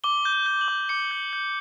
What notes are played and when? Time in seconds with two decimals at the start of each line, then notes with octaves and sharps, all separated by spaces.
0.04 D6 G7
0.25 G6
0.33 G7
0.46 G6
0.61 F#7
0.68 D6
0.89 D6 C#7
1.11 G6
1.33 G6